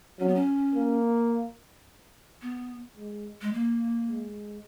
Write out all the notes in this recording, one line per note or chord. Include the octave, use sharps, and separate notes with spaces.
F#3 C#4
B3
C#4
A#3
B3
G#3
G#3
A#3
G#3